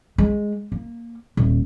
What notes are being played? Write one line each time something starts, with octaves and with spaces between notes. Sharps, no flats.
G#3
A#3
D#1